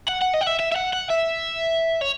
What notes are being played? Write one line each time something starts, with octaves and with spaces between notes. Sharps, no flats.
F#5
F#5
D#5
F#5
E5
E5
E5
F#5
F#5
E5
C#5